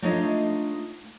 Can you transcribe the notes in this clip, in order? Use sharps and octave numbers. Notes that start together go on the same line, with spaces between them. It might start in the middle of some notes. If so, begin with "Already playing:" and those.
A3 D4 D#4 F4 C#5 D#5